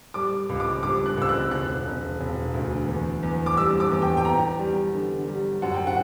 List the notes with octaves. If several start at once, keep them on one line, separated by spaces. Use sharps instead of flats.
G3 D6
C#2
D6
G3 D6
F#6
C#2 E6
F#6
E1 F#6
E1
E1
D2
E2
E2
D6
G3 E6
D6
E2
G5
G5
B3 A#5
G3
D3
G3
F#2 F#5
G5
F#5